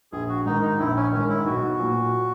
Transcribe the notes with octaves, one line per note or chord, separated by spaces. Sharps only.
A#1 G#4
F#4
G#2 D#3 D#4
D#4
A#1 E4
C#4
G#2 D#3 C#4
E4
B1 F#4
A#2 F#3 A#3